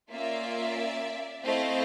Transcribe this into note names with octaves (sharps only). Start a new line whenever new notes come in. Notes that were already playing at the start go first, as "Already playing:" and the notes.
A#3 C#4 F4 D5 E5
A3 C4 E4 D#5 F5